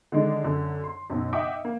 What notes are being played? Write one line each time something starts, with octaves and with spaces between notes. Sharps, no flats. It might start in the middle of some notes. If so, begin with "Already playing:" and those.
D3 D#3 G#3 D4
F#2 D3
C6
B1 F#2
D#5 E5 F#5 G5 D6 D#6
A#3